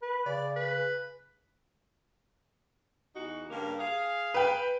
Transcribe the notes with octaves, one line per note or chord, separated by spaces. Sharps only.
B4
C#3 D5
B4
E2 D#4 F#4
G2 C#3 A#3
G#4 F5
B4 G5